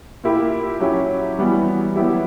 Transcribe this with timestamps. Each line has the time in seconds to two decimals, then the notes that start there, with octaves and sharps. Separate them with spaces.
0.24 A#2 A#3 E4 G4
0.80 F#3 C#4 E4 G4
1.39 E3 G3 B3 F#4
1.96 F#3 B3 E4 G4